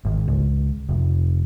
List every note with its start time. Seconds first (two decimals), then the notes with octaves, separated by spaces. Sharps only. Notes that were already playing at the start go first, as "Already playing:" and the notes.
0.05 G#1
0.28 C#2
0.89 F1